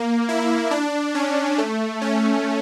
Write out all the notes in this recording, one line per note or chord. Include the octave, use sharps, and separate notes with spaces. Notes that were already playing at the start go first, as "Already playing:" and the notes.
Already playing: A#3
E4
D4
C#4
A3
C#4